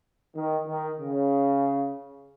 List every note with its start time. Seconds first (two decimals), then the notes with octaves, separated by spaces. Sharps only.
0.35 D#3
0.68 D#3
1.00 C#3